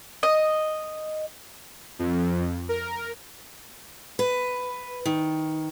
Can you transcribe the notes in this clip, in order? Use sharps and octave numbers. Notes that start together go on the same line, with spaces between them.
D#5
F2
A#4
B4
D#3